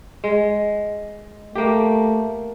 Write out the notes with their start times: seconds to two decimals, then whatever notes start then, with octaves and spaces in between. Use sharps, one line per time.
0.24 G#3
1.55 A3 A#3 G4